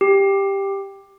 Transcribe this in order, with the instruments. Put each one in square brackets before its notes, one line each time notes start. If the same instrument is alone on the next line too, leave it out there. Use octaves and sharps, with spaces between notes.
[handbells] G4